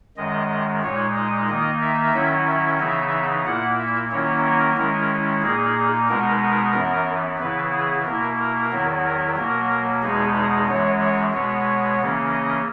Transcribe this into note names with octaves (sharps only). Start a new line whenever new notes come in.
F#2 D#3 G#3 D#5
A#2 G#3 D#4 C#5
D#5
D#3 A#3 D#4 D#5
E5
D#3 F#3 C#4 E4
E5
C#3 E3 B3 D#4 E5
A#2 A#3 E4 F#5
E5
D#3 F#3 A#3 C#4 E4 C#5
A#4
D#3 G#3 C#4 E4
A#2 A#3 D#4 G#4
B2 G#3 B3 D#4 A#4
A#4
F#2 E3 B3
C#3 E3 B3 E4 B4
G#4
B2 A#3 E4 A#4
A#4
E2 D#3 F#3 B3 E4
A#4
B2 F#3 A#3 A#4
E2 B2 G#3 B3 D#4 G#4
G#4
F#2 E3 G#3 C#5
C#5
B2 G#3 B3 C#5
C#3 E3 A#3 C#4
D#5